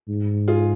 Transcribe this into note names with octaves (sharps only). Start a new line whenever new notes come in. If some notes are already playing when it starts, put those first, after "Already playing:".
G#2
F4 G#4